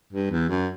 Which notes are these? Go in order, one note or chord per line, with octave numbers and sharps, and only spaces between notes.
G2
E2
F#2